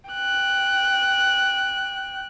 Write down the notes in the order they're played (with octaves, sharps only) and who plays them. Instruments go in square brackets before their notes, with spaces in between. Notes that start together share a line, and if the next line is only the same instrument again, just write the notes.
[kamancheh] G5 F#6